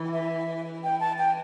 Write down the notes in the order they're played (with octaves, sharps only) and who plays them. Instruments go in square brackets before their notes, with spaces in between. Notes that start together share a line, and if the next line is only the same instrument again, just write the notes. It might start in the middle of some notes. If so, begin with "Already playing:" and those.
Already playing: [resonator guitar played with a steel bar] E3
[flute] E5
G5
A5
G5